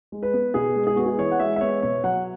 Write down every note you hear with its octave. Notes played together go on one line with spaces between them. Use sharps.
G#3
B4
B3
B2 G#4
G#3
G#4
B3 F#4
G#4
E3 C#5
F#5
G#3 E5
E5
B3 C#5
B2 C#5
F#3 F#5